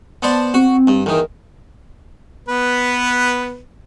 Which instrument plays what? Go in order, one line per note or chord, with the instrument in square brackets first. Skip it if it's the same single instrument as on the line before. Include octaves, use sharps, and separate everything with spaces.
[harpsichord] B3 C5 D5 [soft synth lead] A5
[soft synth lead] C4 [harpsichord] F#4
[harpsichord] G2
[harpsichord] E2 D#3 [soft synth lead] A#4
[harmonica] B3 B4